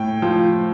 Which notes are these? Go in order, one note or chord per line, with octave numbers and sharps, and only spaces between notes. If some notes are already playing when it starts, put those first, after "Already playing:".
Already playing: A2 G5
F3